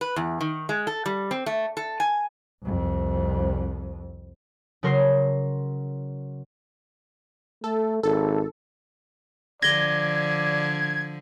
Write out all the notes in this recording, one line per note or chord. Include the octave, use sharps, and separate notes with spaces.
B4
E2
D#3
G#3
A4
G3
C4
A3
A4
G#5
C2 F2
C#3 F#3 A#4 C6 C7
A3 A4
G#1 A4
D3 F3 D5 G#6 A#6 G7